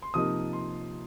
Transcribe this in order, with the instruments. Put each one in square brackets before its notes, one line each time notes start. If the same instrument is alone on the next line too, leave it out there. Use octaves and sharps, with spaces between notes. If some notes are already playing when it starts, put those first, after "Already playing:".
[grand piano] C6
C3 F3 A#3 D#4 D#6
C6